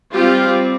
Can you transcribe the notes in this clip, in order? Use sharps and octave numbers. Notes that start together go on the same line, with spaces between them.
G3 C4 F4 G4